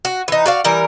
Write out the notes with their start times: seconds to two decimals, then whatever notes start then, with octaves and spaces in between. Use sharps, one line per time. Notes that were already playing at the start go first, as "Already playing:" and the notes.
0.05 F#4
0.28 E3 D#4
0.46 F#4 D5 F5
0.65 E3 G3 A#4